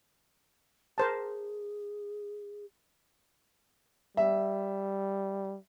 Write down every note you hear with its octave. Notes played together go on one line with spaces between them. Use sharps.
G#4 A#4 C5 A5
G3 E5